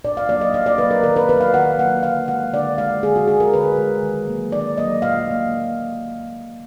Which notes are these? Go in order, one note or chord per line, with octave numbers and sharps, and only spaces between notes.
A#2 D5
F5
F#3 A#3 D5
D#5
A#2 F5
D5
F#3 A#3 B4
A#4
D#3 A#4
B4
F#3 A#3 B4
F5
D#3 F#5
F#3 A#3 F#5
D3 F5
G#3 F#5
D3 D5
G#3 F5
D3 G#4
F#4
G#3 G#4
A#4
D3 B4
G#3
D#3
F#3 A#3
D#3 D5
F#3 A#3 D#5
A#2 F5
F#3 A#3